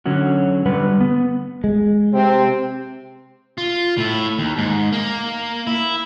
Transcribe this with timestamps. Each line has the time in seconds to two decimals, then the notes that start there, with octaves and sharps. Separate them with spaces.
0.06 D3 F#3 C#4 F#4
0.65 D3 G3 B4 F#5
1.00 B3
1.64 G#3
2.13 C3 C4
3.58 F4
3.97 A2 E4
4.39 D#2
4.58 G#2
4.92 A#3
5.67 E4